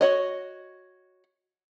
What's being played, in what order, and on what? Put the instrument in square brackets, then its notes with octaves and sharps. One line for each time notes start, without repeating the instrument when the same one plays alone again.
[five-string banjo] F#4 C#5 D#5